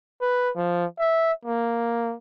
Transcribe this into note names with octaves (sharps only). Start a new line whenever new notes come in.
B4
F3
E5
A#3